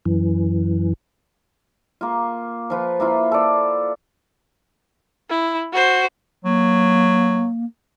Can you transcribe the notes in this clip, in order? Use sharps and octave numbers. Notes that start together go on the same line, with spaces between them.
F#2 E3
A#3 F4
F3 F4 B4
A#3 E4 F4
A4 D5
E4
F#4 C5
F#3 A#3